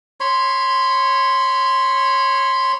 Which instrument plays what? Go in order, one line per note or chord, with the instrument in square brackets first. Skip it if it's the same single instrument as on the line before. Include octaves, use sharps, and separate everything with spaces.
[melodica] C#5 B5 C6